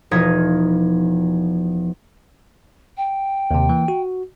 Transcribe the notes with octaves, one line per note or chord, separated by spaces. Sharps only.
E1 F3 D#4 D#5 G#6 B6
G5
D#2 C3
E3 A#3
F#4